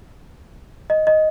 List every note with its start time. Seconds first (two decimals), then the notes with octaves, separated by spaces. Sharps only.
0.90 D#5
1.07 D#5